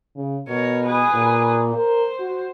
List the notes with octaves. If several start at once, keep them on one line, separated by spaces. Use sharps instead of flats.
C#3
B2 A#4 C#5
G#4 B4
A#2
A#4 C5
F#4